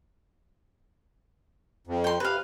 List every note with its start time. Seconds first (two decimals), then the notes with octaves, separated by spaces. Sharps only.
1.87 F2
2.04 G5 C6
2.20 C3 B4 F5